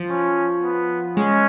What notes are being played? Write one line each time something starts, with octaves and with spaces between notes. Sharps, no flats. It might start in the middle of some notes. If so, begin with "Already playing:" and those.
Already playing: F3
C#4
B3
G#3 C#4